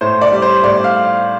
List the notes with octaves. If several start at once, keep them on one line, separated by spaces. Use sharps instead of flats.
A2 C5
D5
G3
C5
A2 D5
F5